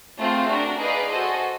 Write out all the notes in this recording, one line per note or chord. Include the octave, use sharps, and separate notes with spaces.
A3 C4 F4 G#4
D4 F#4 A#4
D#4 G#4 B4 D5 F5
F#4 A4 C5 D#5 G#5